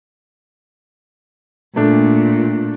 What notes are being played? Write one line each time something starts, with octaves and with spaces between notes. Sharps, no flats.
A#2 A3 D4